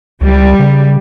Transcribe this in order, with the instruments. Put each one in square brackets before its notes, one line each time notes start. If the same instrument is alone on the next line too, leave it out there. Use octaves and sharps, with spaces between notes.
[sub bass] C#2 [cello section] G3
[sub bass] C#3